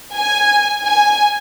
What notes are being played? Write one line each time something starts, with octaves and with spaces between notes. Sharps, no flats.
G#5
G#5